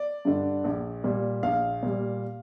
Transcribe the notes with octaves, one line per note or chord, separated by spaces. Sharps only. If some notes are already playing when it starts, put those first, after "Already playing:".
Already playing: D5
G2 D3
A#1
A#2 G3
A#1 F5
A#2 G3